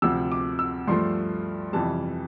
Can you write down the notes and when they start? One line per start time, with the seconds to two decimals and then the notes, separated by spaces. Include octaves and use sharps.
0.02 D2 C3 F3 E6
0.32 D6
0.59 E6
0.88 G2 F3 A3 C6
1.73 F2 C3 E3 G3 A5